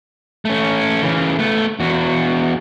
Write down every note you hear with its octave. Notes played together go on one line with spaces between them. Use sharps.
A3 C#4
C#3 E3
A3 B3
E2 F#4